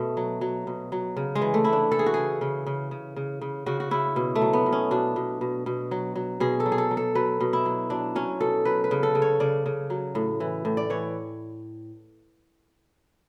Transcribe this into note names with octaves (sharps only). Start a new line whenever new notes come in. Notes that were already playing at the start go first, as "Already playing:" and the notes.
Already playing: B2 A3
F#3
F#3
B2
F#3
C#3
G#3
E3
A3
E3 E4
D4
E3 A4
G#4
F#4
C#3 G#4
C#3
C#3
C#3
C#3
C#3
C#3 F#4
F#4
C#3 E4
B2
A3
F#3
B3
B2
C#4
B2 D4
B2
B2
B2
F#3
F#3
B2 G#4
A4
F#3
G#4
A4
F#3
A4
F#3 B4
B2
E4
F#3
F#3 D4
F#3 C#4
B2 A4
F#3 B4
B4
C#3
A4
C#3
C#5
C#3 D5
C#3
F#3
A2
E3
A2
D5
E3 C#5